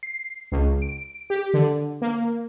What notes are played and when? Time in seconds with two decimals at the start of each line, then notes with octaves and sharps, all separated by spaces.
0.03 C7
0.52 C#2
0.82 D7
1.30 G4
1.54 D3
2.02 A#3